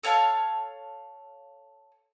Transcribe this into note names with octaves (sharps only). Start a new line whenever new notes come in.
A4 C#5 F5 A5